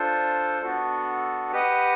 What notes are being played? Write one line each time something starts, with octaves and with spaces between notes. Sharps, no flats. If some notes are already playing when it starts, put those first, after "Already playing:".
Already playing: D4 F4 A4 C5
B3 D4 F#4 A4
G4 B4 D#5 F#5